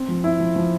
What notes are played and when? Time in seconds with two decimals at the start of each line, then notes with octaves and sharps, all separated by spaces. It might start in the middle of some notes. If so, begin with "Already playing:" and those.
Already playing: C4
0.08 F3
0.24 E4
0.40 F3
0.56 F3